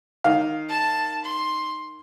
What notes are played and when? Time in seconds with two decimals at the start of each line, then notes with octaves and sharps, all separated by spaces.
0.24 D#3 F5
0.69 A5
1.25 C6